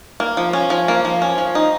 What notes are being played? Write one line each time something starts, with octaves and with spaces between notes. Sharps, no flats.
A#3
F3
C#4
F3
A#3
F3
C#4
F3
D#4